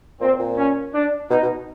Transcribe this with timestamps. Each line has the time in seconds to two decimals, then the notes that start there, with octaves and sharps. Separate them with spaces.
0.21 A#2 C4
0.39 A#2
0.57 C#4
0.94 D4
1.30 B2 D#4
1.42 B2